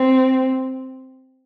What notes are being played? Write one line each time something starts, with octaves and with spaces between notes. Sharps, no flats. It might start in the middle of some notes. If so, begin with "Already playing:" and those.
Already playing: C4